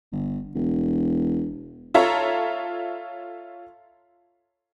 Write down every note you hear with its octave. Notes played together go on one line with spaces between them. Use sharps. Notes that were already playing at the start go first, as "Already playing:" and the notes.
G1
E1
F4 A4 C#5 E5 A#5